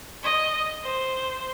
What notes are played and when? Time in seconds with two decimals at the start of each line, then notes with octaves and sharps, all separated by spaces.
0.23 D#5
0.85 C5